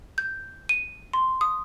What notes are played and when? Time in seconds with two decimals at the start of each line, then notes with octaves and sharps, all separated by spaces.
0.18 G6
0.69 D#7
1.13 C6
1.41 D#6